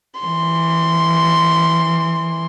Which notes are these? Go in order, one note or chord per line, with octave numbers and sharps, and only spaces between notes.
E3 C6